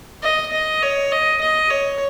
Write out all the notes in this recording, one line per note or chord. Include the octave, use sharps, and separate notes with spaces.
D#5
D#5
C#5
D#5
D#5
C#5